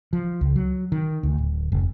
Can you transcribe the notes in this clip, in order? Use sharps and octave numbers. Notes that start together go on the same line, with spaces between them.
F3
C#2
F#3
D#3
D2
D1
F1